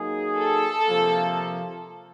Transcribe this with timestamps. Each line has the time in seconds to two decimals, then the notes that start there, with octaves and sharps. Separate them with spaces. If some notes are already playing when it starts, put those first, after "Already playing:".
Already playing: F#3 A#3 D#4 G#4
0.38 A4
0.86 C3 F3 A#3